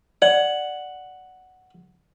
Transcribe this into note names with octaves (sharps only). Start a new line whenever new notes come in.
D5 F#5